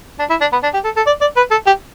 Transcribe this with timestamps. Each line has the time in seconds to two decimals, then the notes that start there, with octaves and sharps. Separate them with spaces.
0.19 D4
0.30 E4
0.41 D4
0.52 B3
0.63 D4
0.74 G4
0.84 A4
0.97 A4
1.07 D5
1.21 D5
1.37 B4
1.51 A4
1.67 G4